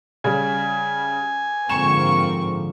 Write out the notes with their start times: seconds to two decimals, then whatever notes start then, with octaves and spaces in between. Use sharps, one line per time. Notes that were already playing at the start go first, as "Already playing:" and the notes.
0.24 C#3 G3 G#5
1.70 G#2 D3 F3 A#3 C4 C#6 E7